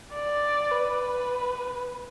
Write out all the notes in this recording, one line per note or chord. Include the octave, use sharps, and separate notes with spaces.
D5
B4